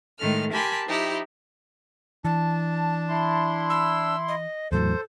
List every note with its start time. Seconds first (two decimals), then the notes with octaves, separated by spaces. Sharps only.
0.18 A2 D#3 G#3 A4 F6
0.50 G4 A#4 G#5 A5 B5 C6
0.86 F3 D#4 E4 G4
2.25 E3 D4 A5
3.09 E4 C6
3.70 E6
4.28 D#5
4.72 E2 A2 F#3 A4 C5